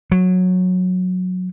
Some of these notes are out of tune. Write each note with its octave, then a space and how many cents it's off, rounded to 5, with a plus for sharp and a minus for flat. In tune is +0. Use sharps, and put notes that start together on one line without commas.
F#3 -15